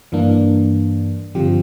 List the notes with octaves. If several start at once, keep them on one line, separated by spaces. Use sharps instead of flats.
G2 E3 A#3 D4
G2 D3 F3 C4 G4